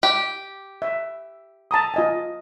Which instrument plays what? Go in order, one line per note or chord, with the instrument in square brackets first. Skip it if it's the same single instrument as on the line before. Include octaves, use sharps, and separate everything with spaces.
[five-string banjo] G4
[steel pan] E5
A5 A#5 D#6
F4 D#5 G#5